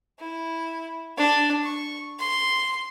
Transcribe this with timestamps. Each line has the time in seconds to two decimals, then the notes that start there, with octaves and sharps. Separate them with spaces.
0.19 E4
1.17 D4
1.63 C#6
2.19 C6